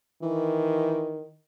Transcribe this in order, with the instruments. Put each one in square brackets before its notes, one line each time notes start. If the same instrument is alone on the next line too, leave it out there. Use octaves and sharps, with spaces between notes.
[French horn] D#3 [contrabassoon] E3